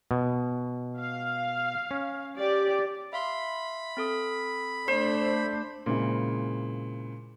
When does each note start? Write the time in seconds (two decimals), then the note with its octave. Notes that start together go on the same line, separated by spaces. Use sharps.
0.11 B2
0.99 F5
1.91 C#4
2.38 G4 D5
3.13 E5 F5 B5 C6
3.97 C4 A4 D#6
4.88 A3 D4 C5
5.86 A#2 C#3 G#3 C4 E4